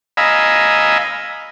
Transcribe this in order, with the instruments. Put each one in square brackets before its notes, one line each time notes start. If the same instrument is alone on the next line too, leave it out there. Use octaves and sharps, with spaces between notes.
[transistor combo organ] D#5 F5 G#5 A#5 B5 E6